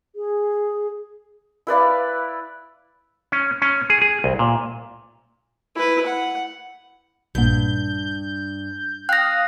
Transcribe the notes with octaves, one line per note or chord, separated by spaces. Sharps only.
G#4
E4 B4 D5 F5
C#4
C#4
G#4
G#4
C2
A#2
E4 B4
F#5
A#1 G2 A#2 G6
F5 G5 D#6 F#6 A#6